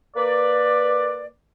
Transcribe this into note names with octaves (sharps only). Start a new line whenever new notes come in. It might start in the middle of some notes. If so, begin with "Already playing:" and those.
A#3 B4 D5